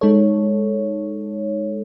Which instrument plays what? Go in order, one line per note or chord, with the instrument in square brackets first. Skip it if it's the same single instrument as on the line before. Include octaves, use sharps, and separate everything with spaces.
[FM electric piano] G#3 D#4 A4 C#5